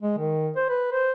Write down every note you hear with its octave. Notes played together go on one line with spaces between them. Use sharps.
G#3
D#3
C5
B4
C5